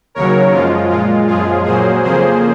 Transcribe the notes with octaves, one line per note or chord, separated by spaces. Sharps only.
D#2 C#3 F#3 A#4 C#5
F#2 F3 G#3 F4
A#2 G#3 F4
F#2 F3 G#3 F4 G#4
A#2 F#3 A#3 G#4 C5
F2 C#3 F3 A#3 G#4 C5